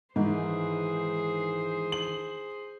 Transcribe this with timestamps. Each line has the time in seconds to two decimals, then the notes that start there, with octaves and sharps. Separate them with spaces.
0.16 G#2 D#3 E3 G#4 C5
1.92 F#7